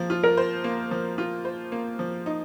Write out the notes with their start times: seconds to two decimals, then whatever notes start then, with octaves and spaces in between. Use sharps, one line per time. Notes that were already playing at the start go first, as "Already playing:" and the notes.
Already playing: F3 A#3
0.10 F4
0.24 A#4
0.37 C5
0.64 A#3
0.91 F3
1.18 F4
1.45 C5
1.72 A#3
1.99 F3
2.26 D#4